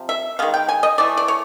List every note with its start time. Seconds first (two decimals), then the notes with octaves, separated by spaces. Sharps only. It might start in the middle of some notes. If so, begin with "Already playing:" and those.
Already playing: C3 F3
0.09 E5
0.39 D#3 G#3 B3 F5
0.54 G5
0.69 G#5
0.83 D#5
0.98 E3 A3 D5
1.17 D5
1.28 C#5